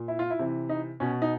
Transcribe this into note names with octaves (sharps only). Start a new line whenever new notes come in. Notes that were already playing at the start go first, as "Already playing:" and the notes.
Already playing: A#2
E4
F4
E4
C3 E3
D#4
B2 C#4
D#4